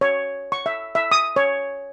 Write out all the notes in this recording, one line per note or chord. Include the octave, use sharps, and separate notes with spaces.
C#5
C#6
E5
E5
D#6
C#5